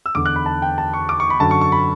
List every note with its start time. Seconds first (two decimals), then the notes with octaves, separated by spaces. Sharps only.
0.06 E6
0.15 E2 D3 D6
0.26 F#6
0.36 B5
0.46 A5
0.62 G5
0.78 A5
0.94 C#6
1.09 D6
1.20 C#6
1.30 B5
1.40 F#2 D3 A5
1.51 C#6
1.61 C#6
1.72 B5